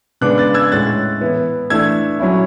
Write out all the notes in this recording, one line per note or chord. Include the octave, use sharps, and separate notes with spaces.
C#3 G#3 B3 D4 D6 F#6
F#6 A6
E6 G#6
A2 G#3 C#4 F#6 A6
E3 B3 E4
E3 A3 D4 E6 G#6
F#3 C#4 E4